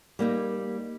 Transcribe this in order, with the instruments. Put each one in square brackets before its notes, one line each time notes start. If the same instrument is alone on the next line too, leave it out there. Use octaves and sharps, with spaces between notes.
[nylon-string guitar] G3 A#3 D#4